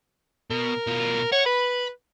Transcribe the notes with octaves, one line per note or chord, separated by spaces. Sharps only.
B2 A#4
B2 F4
C#5 F#5
B4 B5